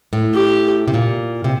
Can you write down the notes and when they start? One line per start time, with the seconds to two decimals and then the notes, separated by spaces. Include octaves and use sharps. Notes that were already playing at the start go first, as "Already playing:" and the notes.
0.13 A2
0.34 G4
0.88 C3
0.94 A#2
1.44 C3